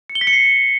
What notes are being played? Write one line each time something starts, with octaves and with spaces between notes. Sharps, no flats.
C#7
G7
B6
C#7
C7